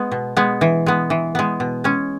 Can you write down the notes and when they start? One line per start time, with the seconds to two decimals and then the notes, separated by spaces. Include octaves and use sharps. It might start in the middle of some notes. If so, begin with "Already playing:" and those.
Already playing: G#3 B3
0.11 B2
0.37 G#3 B3
0.61 E3
0.86 G#3 B3
1.10 E3
1.35 G#3 B3
1.60 B2
1.84 G#3 C#4